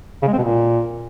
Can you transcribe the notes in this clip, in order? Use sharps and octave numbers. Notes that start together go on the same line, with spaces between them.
C#3
G#3
C4
B2
A#2